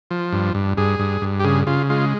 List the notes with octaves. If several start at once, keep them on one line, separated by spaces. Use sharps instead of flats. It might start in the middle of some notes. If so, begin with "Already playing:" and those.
F3
G2
G2
G2 G#4
G2
G2
G4
C#3 G#4
C#3 F4
G#3 F4